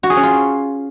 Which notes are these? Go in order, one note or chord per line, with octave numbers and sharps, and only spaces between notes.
F#4
G#4
C#4
F4